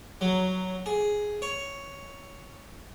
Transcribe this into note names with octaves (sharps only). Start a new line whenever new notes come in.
F#3
G#4
C#5